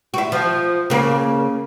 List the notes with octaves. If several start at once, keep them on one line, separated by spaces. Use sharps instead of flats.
E4 F#4
F3
C#3 A#3